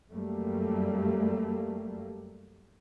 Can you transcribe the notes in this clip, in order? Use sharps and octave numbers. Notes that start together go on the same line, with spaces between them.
F#2 G3 A3 A#3